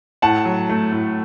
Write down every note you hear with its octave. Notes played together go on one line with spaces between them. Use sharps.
A2 F#5 A5
F#3
A3
A2